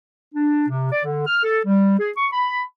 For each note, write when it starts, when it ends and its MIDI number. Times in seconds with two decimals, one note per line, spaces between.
0.34 0.67 62
0.69 0.91 48
0.91 1.01 74
1.04 1.24 50
1.26 1.41 89
1.43 1.59 69
1.65 1.97 55
1.99 2.10 68
2.17 2.27 85
2.33 2.61 83